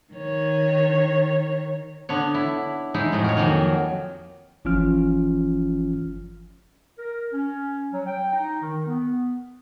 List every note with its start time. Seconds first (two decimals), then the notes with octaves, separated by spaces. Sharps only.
0.14 D#3 C#5
2.09 D3 B3 D4 C#5
2.34 E4
2.94 G#3 D#4 E4
3.12 F2 A2 F#3
3.24 A#4 C#5
3.37 F2 D#3 F#3 A#3 G#5
4.65 G1 E3 F3 C#4 F4 F6
6.99 A#4
7.33 C#4
7.91 F#3
8.07 G5
8.33 D#4
8.61 D#3
8.87 B3